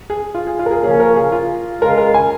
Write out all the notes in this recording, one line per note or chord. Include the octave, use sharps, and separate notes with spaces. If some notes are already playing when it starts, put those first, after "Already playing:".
G#4
F4
G#4
F4
A#4
G#4
C#3 F3 A#3 C#4 G#4
A#4
G#4
F4
C#3 G#3 F4 A#4
A#4
G#5